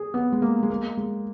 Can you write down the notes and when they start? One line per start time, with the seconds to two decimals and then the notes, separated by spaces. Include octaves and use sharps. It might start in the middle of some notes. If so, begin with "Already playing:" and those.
Already playing: G#4
0.14 B3
0.32 G#3
0.42 A#3
0.63 G#3
0.70 A#3
0.97 G#3